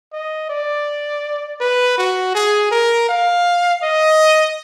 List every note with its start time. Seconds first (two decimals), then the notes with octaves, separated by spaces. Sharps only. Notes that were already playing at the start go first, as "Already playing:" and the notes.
0.13 D#5
0.50 D5
1.61 B4
1.98 F#4
2.35 G#4
2.72 A#4
3.09 F5
3.83 D#5